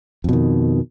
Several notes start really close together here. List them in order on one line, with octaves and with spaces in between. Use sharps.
F2 B2 D#3